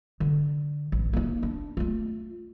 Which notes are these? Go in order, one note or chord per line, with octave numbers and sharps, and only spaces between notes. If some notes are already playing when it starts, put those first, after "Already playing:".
D3
A1
A#3 D#4
D4
A3 F4